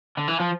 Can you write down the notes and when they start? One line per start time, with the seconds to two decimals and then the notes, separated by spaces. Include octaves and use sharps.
0.17 D3
0.28 E3
0.40 F3